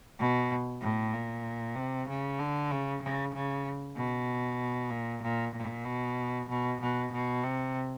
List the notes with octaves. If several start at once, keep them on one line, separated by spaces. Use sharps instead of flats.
B2
A2
A#2
C3
C#3
D3
C#3
C#3
C#3
B2
A#2
A#2
A#2
B2
B2
B2
B2
C3